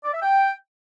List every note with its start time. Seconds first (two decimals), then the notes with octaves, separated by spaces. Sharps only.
0.04 D5
0.13 E5
0.22 G5